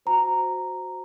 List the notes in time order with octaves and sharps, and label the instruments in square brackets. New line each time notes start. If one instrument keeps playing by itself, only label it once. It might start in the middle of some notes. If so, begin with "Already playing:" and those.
[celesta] F#4 C5 A#5